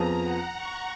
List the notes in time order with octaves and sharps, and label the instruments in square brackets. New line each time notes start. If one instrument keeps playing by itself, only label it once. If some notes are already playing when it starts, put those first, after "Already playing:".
Already playing: [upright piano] F2 F3 B3 F4 G#4 [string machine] A#5
[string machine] F#5
C#6